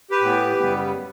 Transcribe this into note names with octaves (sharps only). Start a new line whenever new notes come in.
G4 B4
A2 E3 B3
F#2 C#3 G3 B3